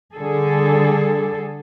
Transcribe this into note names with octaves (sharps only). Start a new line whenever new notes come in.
D3 G3 G#4 A4